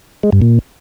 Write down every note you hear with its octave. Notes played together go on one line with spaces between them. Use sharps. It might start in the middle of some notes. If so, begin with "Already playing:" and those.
G#3
G2
A#2